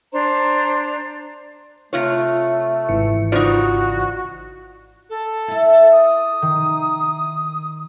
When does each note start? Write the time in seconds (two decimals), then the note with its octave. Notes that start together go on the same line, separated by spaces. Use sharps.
0.12 D4 C5 A#5
1.93 C3 A3 F4 C#5
2.89 G#1 E3 C#7
3.32 C#3 D#4 F4 F#4 C5 D5
5.10 A4
5.48 E4 E5
5.92 D#6
6.42 D#3